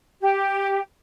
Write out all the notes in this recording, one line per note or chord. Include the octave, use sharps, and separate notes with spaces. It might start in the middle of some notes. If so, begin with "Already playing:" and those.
G4